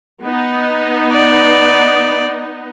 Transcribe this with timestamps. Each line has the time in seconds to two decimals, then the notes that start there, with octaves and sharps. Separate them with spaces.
0.23 B3 D#4
1.12 D5